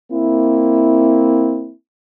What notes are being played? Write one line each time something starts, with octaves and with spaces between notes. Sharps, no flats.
A#3 C4 E4